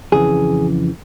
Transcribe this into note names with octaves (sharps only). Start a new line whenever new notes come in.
F2 C#3 E3 G#4